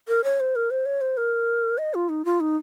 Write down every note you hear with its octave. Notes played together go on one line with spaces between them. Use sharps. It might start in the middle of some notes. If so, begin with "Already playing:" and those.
A#4
C#5
C5
A#4
C5
C#5
C5
A#4
D#5
F4
D#4
F4
D#4